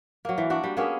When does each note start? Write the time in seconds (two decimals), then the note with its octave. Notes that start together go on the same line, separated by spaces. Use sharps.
0.25 F#3 A#3
0.38 E3
0.50 D4 F#4
0.64 G3
0.77 A#3 B3 C#4 G#4